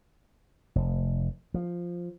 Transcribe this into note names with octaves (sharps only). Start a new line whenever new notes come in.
F1
F3